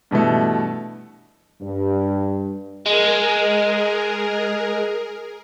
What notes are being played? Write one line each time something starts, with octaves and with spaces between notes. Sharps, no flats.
G2 B2 E3 A3
G2
G#3 G#4 A#4